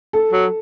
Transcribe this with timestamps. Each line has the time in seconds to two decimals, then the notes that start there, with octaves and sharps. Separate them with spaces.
0.13 A4
0.32 F#3